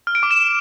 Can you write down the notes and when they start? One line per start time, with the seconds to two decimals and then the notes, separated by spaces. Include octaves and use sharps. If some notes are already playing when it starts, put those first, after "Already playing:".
0.07 F6
0.15 D7
0.23 D6
0.31 E7